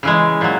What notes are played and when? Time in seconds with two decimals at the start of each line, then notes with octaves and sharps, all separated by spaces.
0.03 C#3 E3 G#3
0.41 A#2 F#3